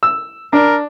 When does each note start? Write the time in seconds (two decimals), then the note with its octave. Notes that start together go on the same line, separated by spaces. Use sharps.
0.03 E6
0.53 D4 A#4